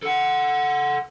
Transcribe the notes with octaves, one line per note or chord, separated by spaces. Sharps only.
A4 F#5